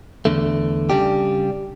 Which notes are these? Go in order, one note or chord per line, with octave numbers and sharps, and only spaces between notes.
E2 D3 A3
C#3 G3 D4 G4